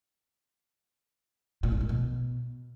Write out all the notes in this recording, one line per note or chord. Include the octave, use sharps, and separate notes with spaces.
A#2
A2
G#2
B2